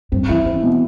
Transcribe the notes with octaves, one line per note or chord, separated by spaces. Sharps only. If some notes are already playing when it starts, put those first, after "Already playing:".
G2 C4
E3 E4
E3 C4
B2